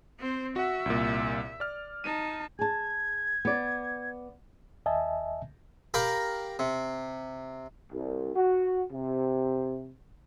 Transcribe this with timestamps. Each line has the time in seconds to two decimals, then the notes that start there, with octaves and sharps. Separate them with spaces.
0.19 C4 C5
0.56 F#4 E5 F#5
0.86 C2 A#2
1.60 D5 F6
2.04 D#4 A5 D#7
2.59 G#4 A5 G#6
3.45 B3 D5
4.86 D#2 D#5 E5 G#5 A5
5.94 G4 A#4 F5 A#5 B5
6.59 C3
7.92 C2
8.34 F#4
8.92 C3